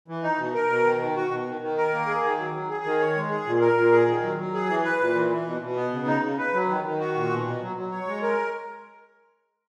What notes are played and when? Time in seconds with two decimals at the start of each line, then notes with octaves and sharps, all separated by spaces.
0.08 E3
0.23 D#4
0.38 B2
0.54 A#4
0.69 B2
0.85 D#3
1.00 D#3
1.16 F#4
1.31 B2
1.46 D#3
1.61 D#3
1.77 A#4
1.92 A#3
2.07 G#4
2.23 D#3
2.38 F#3
2.53 F#3
2.69 G#4
2.84 D#3
3.00 C#5
3.16 G#3
3.30 G#4
3.46 A#2
3.61 A#4
3.77 A#2
3.92 G#4
4.08 D#3
4.23 F#3
4.38 F#3
4.54 G#4
4.69 E3
4.84 B4
5.00 A#2
5.15 E3
5.30 E3
5.46 B2
5.62 B2
5.76 B3
5.92 C#3
6.07 D#4
6.23 C#3
6.38 B4
6.53 F#3
6.69 D#3
6.85 D#3
6.99 F#4
7.15 A#2
7.30 B2
7.46 B2
7.61 F#3
7.76 F#3
7.91 C#5
8.07 G#3
8.22 A#4